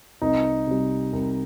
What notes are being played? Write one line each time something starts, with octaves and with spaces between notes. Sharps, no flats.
C2 D#4
C3 G3
C2